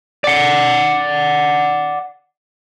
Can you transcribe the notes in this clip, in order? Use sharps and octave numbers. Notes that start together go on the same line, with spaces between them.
D5 F#5